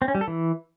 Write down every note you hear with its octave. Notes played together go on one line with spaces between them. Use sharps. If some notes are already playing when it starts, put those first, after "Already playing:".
C4
C#4
G3
A4
E3